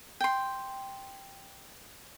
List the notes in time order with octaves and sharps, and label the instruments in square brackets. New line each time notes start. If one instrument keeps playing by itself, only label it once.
[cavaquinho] G5 C6